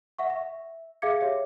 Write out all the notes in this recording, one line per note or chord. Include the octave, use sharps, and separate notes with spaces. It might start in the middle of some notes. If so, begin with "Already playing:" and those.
E5 F#5 C#6
E5
G#4 E5 F5 D6 G#6 C#7
G4 C#5 E5